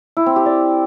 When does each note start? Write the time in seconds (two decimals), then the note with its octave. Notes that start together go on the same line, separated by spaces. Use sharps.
0.17 E4
0.26 C4
0.36 G4
0.46 D5